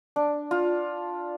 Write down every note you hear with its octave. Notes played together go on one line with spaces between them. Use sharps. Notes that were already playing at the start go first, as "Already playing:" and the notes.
D4
F4